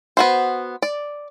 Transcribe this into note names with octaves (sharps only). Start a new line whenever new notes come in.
B3 F#4 C5
D5